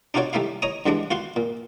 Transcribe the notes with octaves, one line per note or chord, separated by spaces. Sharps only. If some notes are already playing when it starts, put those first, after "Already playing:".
D4 D#4 F4 F#4 C#5 D5
G3 A3 D#4 E4 F5
C#5 D#5 A#5 D#6
G2 D3 E3 G#3 D4
F4 F#4 F5 F#5 C6
A#2